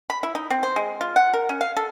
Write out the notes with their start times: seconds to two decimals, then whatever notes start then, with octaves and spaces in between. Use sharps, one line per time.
0.10 B5
0.23 E4
0.35 D#4
0.50 C4
0.63 C5
0.76 G#3
1.01 F4
1.16 F#5
1.34 A#4
1.49 C#4
1.61 F5
1.77 A4